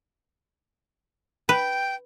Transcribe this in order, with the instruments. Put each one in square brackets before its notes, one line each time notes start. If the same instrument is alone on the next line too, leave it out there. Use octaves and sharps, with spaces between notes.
[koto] B4 [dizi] G5